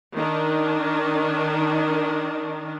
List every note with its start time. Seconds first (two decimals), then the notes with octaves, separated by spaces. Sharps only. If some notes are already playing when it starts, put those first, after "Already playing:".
0.15 D#3 D4